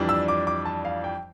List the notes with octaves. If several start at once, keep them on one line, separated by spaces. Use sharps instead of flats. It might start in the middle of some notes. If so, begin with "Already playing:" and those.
Already playing: F2 E3 G3 D4
E6
D6
D6
A5
F5
G5